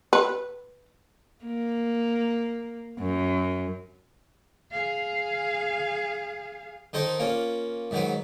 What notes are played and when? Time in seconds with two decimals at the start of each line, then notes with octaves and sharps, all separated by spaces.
0.13 B4
1.44 A#3
2.98 F#2
4.71 G#4 F5
6.93 D#3 D#4 A4 C5
7.19 A#3 C#4 F4
7.91 G#2 D#3 F#3 B4